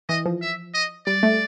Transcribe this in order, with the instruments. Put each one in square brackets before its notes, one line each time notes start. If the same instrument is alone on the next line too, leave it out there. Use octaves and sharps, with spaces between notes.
[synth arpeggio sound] E3 [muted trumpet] D#5
[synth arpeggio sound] F3
[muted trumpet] E5
D#5
[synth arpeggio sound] G3 [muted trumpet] D5
[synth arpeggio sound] A3